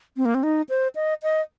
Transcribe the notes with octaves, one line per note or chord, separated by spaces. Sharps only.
C4
A#3
C4
D#4
C5
D#5
D#5